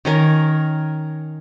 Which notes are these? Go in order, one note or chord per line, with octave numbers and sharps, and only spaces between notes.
D#3 C#4 A#4